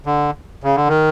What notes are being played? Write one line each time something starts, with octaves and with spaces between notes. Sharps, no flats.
D3
C#3
D3
D#3